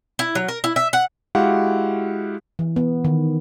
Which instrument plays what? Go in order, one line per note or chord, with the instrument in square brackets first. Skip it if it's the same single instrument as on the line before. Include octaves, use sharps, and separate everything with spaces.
[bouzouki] E4
F#3
A#4
E4
E5
F#5
[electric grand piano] G#3 E4 F#4 G4 F5 F#5
[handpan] E3
B3
D#3